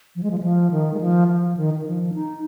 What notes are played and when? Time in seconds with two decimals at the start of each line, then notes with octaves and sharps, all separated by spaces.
0.16 F3
0.23 G#3
0.31 F3
0.38 G#3
0.43 F3
0.71 D#3
0.94 G#3
1.01 F3
1.28 F3
1.57 D#3
1.74 D#3
1.86 F3
2.14 D#4